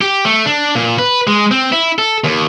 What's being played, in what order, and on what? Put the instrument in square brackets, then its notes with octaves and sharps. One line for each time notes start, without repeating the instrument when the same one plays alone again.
[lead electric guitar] G4
A3
D4
A#2
B4
G#3
C4
E4
A4
D#2